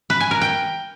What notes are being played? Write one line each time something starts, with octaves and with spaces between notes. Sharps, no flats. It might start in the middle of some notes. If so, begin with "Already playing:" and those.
B4
G#5
A#4
G5